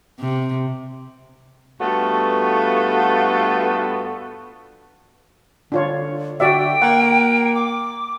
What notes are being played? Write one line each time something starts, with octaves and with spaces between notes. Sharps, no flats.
C3
G2 A3 B3 F4 F#4 A4
D3 D4 F4 C#5
D3 F#4 D5 E5 G5
A#3 F#5
D6